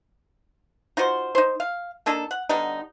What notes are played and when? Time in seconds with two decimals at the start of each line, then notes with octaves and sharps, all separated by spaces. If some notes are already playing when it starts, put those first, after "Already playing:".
0.97 D#4 F4 F#4 C5
1.35 D#4 C5
1.60 F5
2.06 A#3 D4 D#4 A4
2.31 F#5
2.49 D3 G3 B3 D#4